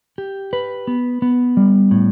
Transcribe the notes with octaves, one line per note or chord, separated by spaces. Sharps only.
G4
B4
B3
B3
G3
A2